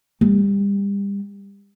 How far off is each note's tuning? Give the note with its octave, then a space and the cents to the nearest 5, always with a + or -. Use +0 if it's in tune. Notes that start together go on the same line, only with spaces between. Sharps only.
G3 +30